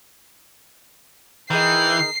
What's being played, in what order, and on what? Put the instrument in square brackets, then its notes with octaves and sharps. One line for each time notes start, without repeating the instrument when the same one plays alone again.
[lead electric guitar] E3 [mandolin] D#4 G#4 A#4 [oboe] G5 [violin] C7